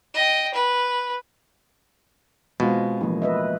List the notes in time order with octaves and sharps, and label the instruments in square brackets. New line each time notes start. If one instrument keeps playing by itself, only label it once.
[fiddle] D#5 G5
B4
[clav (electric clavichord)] B2 [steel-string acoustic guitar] G#3 [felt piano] C4 F4 F#5
[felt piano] A1 [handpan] F3 A#3
[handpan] B4 D#5 E5